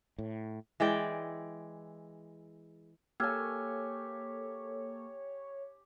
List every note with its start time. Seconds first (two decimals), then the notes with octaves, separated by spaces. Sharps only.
0.18 A2
0.80 E3 G#3 D5 G5
3.20 A#3 G4 A4 C#5 G#5 E6 F6 G#6